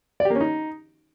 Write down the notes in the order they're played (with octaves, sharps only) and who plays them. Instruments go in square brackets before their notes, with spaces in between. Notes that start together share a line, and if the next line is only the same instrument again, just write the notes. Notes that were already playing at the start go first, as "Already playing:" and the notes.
[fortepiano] D5
G4
A#3
C#4
D#4